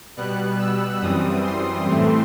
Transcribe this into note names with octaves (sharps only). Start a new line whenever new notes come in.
B2 G3 B3 F#6
E6
F#2 E3 G3 C4 D#6
C6
A2 E3 A3 C4